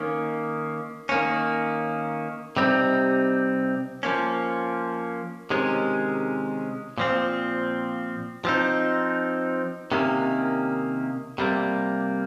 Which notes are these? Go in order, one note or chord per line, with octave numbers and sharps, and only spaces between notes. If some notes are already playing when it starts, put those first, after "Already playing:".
Already playing: D#3 A#3 C#4
D#3 A#3 C#4
C3 G3 C4 D#4
F3 A#3 C#4
C3 D#3 G#3 C#4
A#2 F3 C4
F3 C4 D#4
C3 D#3 A#3 C#4
C3 G3 A#3